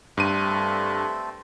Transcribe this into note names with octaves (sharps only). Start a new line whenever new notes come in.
G2 A3 C4 A4 D#7